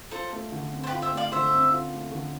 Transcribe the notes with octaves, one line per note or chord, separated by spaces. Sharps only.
F4 A4 C5
A3
D3
C4
C5
G4 B4
F4
C5 E5
A3
D5 F5
D3 C5 E5
C4
F4
A3
D3